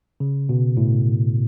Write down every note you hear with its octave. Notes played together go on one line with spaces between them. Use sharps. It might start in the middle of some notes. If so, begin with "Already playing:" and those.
C#3
B2
A2